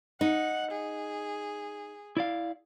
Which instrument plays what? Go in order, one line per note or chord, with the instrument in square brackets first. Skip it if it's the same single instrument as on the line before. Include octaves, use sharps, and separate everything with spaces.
[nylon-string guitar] D#4 [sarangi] F#5
[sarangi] G#4
[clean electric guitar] E4 D5 F5